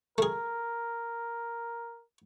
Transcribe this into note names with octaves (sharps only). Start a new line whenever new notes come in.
A3 G#4 A#4